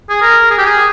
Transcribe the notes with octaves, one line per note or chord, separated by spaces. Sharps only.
G#4
A#4
G#4
G4
G#4